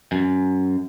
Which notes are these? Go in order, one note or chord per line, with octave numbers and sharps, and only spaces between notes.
F#2